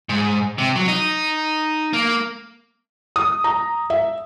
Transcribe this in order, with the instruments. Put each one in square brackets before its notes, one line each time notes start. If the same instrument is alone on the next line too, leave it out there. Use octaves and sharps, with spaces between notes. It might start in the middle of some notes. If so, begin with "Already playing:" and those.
[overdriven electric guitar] G#2
C3
F#3
D#4
A#3
[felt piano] D#6
A#5
E5